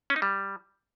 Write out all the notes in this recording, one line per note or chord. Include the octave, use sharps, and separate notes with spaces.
C#4
D#4
G3